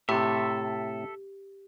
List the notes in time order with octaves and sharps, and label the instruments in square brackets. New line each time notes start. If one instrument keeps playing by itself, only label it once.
[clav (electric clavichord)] A2 C3 [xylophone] G4 [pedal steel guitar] A4 E5